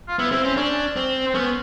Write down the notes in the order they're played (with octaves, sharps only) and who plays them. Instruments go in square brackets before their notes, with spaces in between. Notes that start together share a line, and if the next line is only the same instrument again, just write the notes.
[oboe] F4
[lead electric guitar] B3 [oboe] E4
[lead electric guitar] C4 [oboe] E4
[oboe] C4 [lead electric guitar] C#4
[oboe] C#4 [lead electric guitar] D4
[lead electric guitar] C4
[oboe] C4
[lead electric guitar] B3 [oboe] C#4